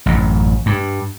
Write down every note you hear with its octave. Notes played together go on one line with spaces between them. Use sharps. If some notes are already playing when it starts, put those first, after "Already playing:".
A1 F#2
G2